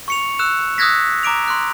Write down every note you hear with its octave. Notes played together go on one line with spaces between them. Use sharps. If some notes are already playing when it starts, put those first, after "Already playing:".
C#6 C#7 F7
E6 F#6 E7
D#6 E6 F#6 G#6 A#6 B6
A#5 D6 D7 F7
C6 F#6